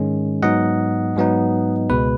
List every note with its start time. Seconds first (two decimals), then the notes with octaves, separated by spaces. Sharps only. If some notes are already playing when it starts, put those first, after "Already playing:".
Already playing: G#2 D#3 G#3 C#4
0.42 G#2 F#3 B3 D#4 D#5 F#5
1.17 G#2 F#3 B3 D#4
1.90 C#2 B2 G#3 B4